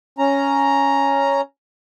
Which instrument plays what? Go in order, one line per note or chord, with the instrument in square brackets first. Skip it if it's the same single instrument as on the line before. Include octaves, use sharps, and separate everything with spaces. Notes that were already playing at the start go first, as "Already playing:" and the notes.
[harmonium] C#4 A#5